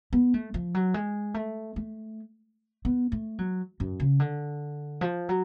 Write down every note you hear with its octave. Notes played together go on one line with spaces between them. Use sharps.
B3
A3
F3
F#3
G#3
A3
A3
B3
A3
F#3
F#2
C#3
D3
F3
F#3